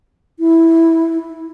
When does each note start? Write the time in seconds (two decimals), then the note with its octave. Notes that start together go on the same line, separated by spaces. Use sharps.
0.39 E4